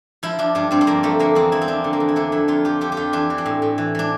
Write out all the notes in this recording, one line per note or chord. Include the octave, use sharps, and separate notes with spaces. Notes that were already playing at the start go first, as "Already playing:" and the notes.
F3 E4
F3 D4
G2 D4
G2 C4
C4
F3 A#3
F3 A3
D3 A#3
E2 C4
E2 E4
C4
F3 D4
D3
A#3
E2
E4
D3 D4
F2 E4
F2 F4
F3 G4
D3 G4
G4
F2 F4
E3 D4
E3
C4
A2
A2
E3
E3 D4